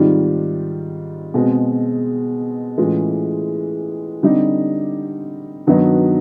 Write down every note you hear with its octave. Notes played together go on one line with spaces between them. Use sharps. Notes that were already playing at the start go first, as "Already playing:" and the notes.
Already playing: G#2 D#3 G3 C4 F4
B2 G#3 C4
A2 E3 G#3 C#4 F4
D3 G3 C4 D#4 G4
G2 D#3 F#3 B3 D#4